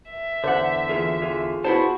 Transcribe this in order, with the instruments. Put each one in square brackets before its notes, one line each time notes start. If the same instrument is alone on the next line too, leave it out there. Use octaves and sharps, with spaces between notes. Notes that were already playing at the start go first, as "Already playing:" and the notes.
[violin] E5
[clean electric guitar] E2 D3 [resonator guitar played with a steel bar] C5 F#5
[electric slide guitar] E3 F4 G#4
F4 G#4
[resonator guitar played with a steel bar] B3 E4 C5 [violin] F#4 [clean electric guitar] A5